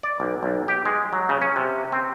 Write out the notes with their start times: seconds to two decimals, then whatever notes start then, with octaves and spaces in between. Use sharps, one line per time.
0.03 D5
0.20 B1
0.43 B1
0.68 G4
0.85 G#3
1.13 F#3
1.29 C#3
1.42 C#4
1.56 C3
1.92 C4